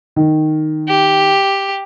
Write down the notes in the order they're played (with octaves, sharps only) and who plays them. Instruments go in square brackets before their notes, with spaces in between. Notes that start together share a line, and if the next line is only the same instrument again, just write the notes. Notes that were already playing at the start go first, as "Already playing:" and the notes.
[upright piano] D#3
[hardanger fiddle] G4